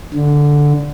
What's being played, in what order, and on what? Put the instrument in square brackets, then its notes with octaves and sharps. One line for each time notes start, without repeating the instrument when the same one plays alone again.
[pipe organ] D3